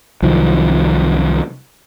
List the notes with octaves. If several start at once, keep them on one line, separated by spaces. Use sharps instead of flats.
C2 D#3 F3 F#3